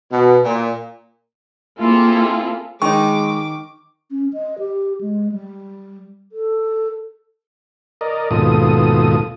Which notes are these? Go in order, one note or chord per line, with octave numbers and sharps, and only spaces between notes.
B2
A#2
A#3 C4 E4 F4 G#4 A4
D#3 G#3 D#4 C#6 D6
C#4
D#5
G4
G#3
G3
A4
A#4 D5 D#5
D#2 G#2 B2 F4 A4 D#6